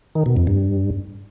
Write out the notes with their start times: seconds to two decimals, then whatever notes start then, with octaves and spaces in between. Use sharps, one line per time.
0.15 D#3
0.26 B2
0.37 F2
0.47 G2